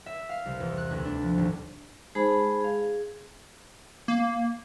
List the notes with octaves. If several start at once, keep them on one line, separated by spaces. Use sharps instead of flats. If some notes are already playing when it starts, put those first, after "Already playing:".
E5
F5
C2
E2
F#6
D2
D4
F3
D#1
G#3 D#4 G#4 C5 A5 B5
G#4 F5
A#3